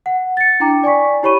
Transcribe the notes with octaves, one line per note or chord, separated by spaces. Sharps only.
F#5
A6 C#7
D4 E4 G5 A#5 D6
D5 G#5 C#6 B6
E4 G4 C#5 B5 C#6 D#7